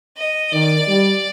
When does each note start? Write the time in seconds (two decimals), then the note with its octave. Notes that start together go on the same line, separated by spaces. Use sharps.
0.17 D#5
0.52 D#3 D5
0.87 G3